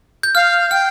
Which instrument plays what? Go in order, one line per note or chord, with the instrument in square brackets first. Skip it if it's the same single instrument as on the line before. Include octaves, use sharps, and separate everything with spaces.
[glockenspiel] G6
[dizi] F5 [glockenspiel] F6
[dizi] G5 [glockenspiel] F6